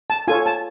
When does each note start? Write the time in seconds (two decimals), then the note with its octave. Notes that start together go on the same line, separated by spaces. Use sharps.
0.10 A5
0.28 F4 A4 C#5 G#5
0.46 A5